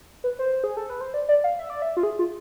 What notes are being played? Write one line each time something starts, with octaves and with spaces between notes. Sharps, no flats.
B4
C5
G#4
A4
B4
C5
D5
D5
F5
E5
D5
E5
F4
G#4
F4